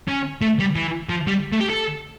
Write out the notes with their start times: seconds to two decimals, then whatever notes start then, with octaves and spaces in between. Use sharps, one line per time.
0.08 C#4
0.42 A3
0.59 G3
0.76 E3
1.10 F3
1.27 G3
1.53 A3
1.61 G4
1.70 A4